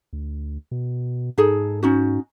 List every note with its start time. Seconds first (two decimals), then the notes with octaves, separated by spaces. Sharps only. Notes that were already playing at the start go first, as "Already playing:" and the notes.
0.13 D2
0.71 B2
1.38 G#2 D#4 G#4 A4
1.83 C#4 D#4 F#4